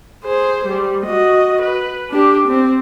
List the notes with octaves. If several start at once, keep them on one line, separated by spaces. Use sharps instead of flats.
G#4 C5
G3
F#4 D#5
B4
D4 G4
C4